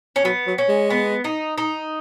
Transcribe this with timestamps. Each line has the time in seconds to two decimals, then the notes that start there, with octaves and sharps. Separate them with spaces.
0.16 C#4
0.24 F#3 B3
0.47 F#3
0.58 C#4
0.69 G#3
0.90 B3
1.24 D#4
1.58 D#4